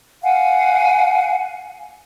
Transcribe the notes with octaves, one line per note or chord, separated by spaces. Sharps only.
F5 F#5 G#5